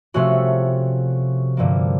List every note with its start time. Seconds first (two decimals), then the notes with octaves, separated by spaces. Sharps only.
0.14 C3 F3 A3 C#4 F#4
1.57 G2 D3 F3 A#3